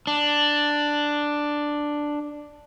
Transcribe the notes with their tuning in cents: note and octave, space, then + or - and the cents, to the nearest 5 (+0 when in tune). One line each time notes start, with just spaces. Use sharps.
D4 +5